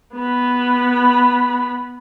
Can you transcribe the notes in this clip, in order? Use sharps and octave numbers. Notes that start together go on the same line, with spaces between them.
B3 B5